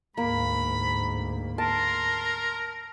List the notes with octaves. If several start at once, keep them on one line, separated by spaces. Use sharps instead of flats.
D2 G#2 A#3 B5
A#4 A5 C6